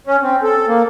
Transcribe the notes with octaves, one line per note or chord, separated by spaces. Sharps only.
C#4
C4
A4
A#3